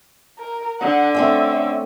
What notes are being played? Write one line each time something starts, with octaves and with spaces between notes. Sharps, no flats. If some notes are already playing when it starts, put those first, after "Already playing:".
A#4
D3 F#5
A3 C4 C#4 E5